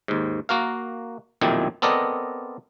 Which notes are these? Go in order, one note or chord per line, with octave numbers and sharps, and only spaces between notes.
D#2 G#2
A#3 F#4 A#4 F5
B1 F2 A#2 D#3 E4 G4
B3 C4 A4 A#4 D5 D#5